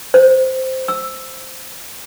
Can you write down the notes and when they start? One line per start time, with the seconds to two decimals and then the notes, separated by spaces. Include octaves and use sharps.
0.14 C5
0.88 E6